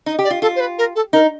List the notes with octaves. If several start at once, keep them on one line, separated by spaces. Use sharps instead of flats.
D#4 D#5
G4
D5
F4
F4 A4
C5
B4
A#4
A4
D#4 A#4